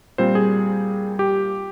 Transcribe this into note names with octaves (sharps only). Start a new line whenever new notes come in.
A#2 G3 C4 C5
G#4
G4